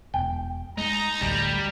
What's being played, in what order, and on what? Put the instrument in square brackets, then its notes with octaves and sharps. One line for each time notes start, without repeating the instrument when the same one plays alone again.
[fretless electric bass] E1 [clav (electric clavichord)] G5
[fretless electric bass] G#3 [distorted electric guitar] D#4 [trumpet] A#5
[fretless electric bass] A1 D2 [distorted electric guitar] G3